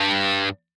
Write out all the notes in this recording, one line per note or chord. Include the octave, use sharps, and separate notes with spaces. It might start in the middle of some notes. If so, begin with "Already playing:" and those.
Already playing: G2